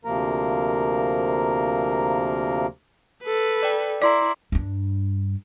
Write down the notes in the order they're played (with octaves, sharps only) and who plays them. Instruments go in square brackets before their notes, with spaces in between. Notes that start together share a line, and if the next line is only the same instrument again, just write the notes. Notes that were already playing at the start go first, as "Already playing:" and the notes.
[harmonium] D2 C3 F3 A#3 A#4 A#5
[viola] A4 B4
[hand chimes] D5 G5
[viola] E4 [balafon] D5 [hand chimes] A#5 C6 D6
[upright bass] G2 D4